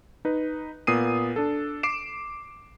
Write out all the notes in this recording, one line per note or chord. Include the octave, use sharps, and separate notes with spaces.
D#4 B4
A#2 B3 D#6 C7 D#7
D4 A4
D6 C7 D7 E7